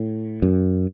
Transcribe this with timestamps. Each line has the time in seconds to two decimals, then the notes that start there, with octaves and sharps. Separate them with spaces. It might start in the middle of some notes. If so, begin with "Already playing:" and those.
Already playing: A2
0.42 F#2